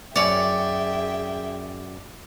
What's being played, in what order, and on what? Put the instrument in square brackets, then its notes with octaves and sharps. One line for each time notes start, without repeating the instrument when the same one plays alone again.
[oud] F#2 C#5 [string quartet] G#4 E5 G5 [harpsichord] D5